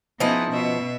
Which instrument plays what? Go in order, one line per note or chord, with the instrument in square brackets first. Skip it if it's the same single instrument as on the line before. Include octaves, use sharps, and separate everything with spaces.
[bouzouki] F3 B4 D#5 [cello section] B3 C#4 [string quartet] D#4 E4 G#4
[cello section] B2 [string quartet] E5